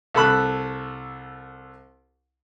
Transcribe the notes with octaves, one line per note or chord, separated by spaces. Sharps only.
C2 A4 B5 F#6